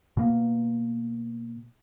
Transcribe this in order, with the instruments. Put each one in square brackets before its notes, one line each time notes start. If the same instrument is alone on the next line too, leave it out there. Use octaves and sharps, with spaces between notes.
[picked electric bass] B2 A#3